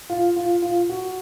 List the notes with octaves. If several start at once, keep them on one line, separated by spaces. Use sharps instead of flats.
F4
F4
F4
F#4